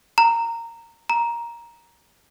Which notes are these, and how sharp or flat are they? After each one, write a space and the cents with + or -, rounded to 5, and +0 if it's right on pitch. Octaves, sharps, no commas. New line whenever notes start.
A#5 -15
A#5 +10